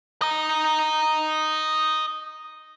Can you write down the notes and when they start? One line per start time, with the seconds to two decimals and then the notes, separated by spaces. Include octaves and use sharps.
0.22 D#5 A#5